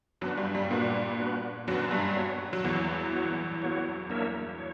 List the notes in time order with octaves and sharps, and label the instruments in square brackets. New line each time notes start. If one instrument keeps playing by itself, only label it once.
[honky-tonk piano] F#2 F#3 [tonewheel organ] B3 D4 F#4 B4
[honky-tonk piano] G2 G3
G2 G3
G3
[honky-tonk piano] A#2 A#3 [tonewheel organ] B3 D4 F#4 B4
[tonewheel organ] B3 D4 F#4 B4
[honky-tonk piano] F#2 F#3 [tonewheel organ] B3 D4 F#4 B4
[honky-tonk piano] G2 G3
[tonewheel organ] B3 F#4 C#5
[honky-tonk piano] F#3
[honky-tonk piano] E2 E3 [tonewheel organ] B3 F#4 C#5
[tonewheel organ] B3 F#4 C#5
B3 F#4 C#5
A#3 D4 A#4 C#5 E5
C#5